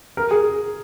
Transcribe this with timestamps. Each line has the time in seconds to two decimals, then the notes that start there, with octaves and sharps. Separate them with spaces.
0.17 A#4
0.31 G#4